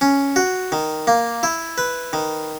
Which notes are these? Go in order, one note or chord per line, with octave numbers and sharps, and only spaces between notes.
C#4
F#4
D#3
A#3
E4
B4
D#3